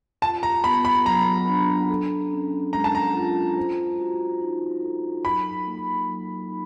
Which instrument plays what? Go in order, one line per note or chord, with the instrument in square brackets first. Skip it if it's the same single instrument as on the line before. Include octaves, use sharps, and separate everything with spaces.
[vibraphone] F4 [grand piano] A5
[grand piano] A#5
[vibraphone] B3 [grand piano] B5
[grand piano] B5
[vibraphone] F#3 [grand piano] A#5
[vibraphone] D4
A4
C#4
[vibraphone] G#3 [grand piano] A#5
[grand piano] A5
A#5
[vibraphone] F4
C5
F#4
D#4
A4
[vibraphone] F#3 [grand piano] B5
[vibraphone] A#3
F#3
D#4